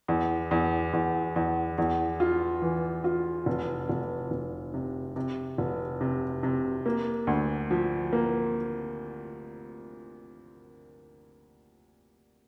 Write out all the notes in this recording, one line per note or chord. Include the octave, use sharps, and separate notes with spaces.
E2
E2
E2
E2
E2
F4
E3
F4
F1
F1
F1
C3
C3
F1
C3
C3
A#3
D2
F3
A#3